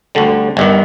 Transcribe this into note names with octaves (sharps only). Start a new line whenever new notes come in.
D2 D3 G3
G1 G2 D#3